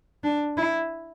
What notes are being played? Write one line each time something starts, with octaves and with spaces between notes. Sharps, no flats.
D4
E4